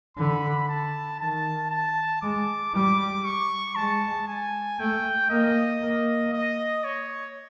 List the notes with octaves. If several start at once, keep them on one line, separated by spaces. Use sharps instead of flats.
D3 B5
A5
D#3 A5
A5
G#3 D6
G3 D6
C#6
G#3 A5
G#5
A3 G5
A#3 D#5
A#3
D#5
C#5